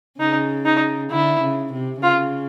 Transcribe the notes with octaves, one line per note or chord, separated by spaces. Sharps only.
C#3 D#4
D#4
D3 E4
C#3
C3
C#3 F4